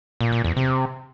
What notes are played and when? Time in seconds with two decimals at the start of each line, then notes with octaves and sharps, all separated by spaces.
0.21 A#2
0.32 A#2
0.44 E2
0.56 C3